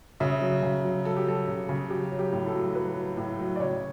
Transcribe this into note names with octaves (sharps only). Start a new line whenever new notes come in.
C#3 E5
F#3
C#3
F#3
F#3 A4
G4
F#3 A4
C#3
C#3
F#3 G4
F#3
G4
A2
A4
F#3
F#3 B4
F#3
A2
F#3
D5
C#3 C#5